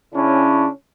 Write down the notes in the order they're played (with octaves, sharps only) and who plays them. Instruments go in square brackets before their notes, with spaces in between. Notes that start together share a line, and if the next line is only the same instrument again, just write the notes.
[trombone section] C#3 C#4 D4 E4